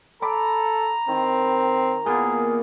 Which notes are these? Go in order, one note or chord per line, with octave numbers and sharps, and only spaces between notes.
A4 A#5 B5 D6
D#3 C4
A#2 A#3 B3 G#4